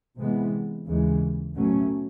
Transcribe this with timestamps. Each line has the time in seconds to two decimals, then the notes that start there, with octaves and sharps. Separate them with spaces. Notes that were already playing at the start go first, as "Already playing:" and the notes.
0.18 C3 E3 G#3 B3
0.85 D#2 C#3 E3 G#3
1.53 B2 F#3 A3 C#4